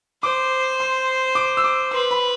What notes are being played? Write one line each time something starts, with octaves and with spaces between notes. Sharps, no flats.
C5 D6
C6
D6
E6
D6
B4 C6
B5